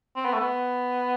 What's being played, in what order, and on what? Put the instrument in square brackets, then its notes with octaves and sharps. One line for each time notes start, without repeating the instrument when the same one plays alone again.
[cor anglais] C4
B3
A3
B3